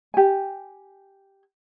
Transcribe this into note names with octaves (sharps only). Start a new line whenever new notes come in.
G4 G#5